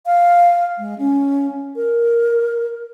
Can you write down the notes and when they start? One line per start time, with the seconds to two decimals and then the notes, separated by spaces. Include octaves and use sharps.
0.06 F5
0.78 G#3
0.98 C#4
1.76 A#4